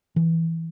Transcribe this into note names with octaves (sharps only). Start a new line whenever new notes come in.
E3